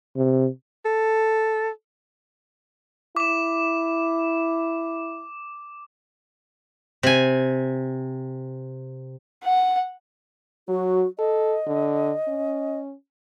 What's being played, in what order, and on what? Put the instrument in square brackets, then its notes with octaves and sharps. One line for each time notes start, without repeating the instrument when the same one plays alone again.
[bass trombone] C3
[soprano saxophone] A4
[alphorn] E4 [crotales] D6 E7
[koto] C3 G#5
[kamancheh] F#5
[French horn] F#3 [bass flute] F#4
[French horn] A4 [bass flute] D#5
[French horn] D3
C#4